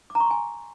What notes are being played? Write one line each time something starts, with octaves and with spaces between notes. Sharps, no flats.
D6
A#5
C#6
C6
G#5